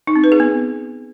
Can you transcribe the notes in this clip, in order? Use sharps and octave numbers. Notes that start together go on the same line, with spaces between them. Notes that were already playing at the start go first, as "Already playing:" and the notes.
D#4
C4
B4
G#4
B3